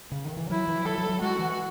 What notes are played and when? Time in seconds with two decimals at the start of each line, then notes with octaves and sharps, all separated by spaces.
0.12 C#3
0.25 D#3
0.37 E3
0.50 F#3 E4
0.68 E3
0.85 F#3 A4
0.98 F#3
1.09 F#3
1.21 G#3 F#4
1.39 E3